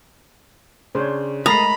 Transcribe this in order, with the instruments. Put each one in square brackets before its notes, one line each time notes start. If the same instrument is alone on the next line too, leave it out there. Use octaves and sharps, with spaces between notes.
[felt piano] C#3 D4 [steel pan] C5 C#5
[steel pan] G#3 A3 A#4 [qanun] A#5 [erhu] B5 [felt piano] D#6 A6 C7